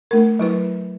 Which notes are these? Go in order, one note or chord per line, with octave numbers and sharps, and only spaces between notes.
A3 A#4
F#3 E4 B4